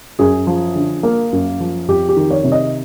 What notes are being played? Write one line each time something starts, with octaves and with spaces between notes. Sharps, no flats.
F#2 G#4
F3
D3
A#3
F#2
F3
F2 G4
G4
D#3
C#5
C3
D#5